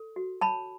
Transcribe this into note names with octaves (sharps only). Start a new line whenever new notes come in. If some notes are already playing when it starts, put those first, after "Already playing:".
Already playing: A4
F#4
C#5 A5 B5